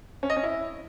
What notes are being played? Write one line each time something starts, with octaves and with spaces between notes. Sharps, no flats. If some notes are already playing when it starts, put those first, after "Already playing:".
C#4
D#5
C#4
E4